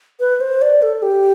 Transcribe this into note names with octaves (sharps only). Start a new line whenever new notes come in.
B4
C5
D5
A4
G4